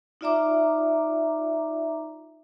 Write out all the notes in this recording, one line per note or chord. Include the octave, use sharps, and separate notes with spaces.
D#4 F4 D5 E5 A#5 D6